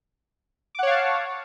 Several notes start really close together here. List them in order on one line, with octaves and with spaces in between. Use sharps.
D6 F#5 C#5 F5 A5